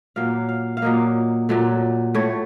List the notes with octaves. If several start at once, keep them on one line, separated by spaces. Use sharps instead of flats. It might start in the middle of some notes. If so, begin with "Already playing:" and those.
A#2 F#3 A#3 F5
F5
F5
A#2 F#3 A#3 D#5
A#2 F#3 A3
A2 A3 C#5